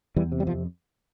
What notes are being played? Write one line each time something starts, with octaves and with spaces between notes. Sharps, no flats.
E2 E3 G3
C3
G3
F2 F3